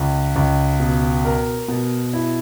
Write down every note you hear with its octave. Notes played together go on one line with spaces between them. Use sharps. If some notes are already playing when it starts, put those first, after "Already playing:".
Already playing: C#2
C#2
B2
A#4
B2
E4